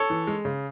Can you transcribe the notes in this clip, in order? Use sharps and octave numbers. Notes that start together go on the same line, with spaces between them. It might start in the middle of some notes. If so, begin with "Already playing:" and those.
Already playing: A4 C#5
E3
G#3
C#3